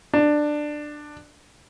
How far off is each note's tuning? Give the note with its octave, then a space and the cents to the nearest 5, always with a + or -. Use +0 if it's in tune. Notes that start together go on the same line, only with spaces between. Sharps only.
D4 +15